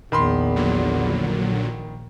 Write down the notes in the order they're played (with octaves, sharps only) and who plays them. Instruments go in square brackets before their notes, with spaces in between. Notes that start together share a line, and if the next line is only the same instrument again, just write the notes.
[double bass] A#1 [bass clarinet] E2 [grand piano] D#3 B5 C6
[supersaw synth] A#2 D3 F#3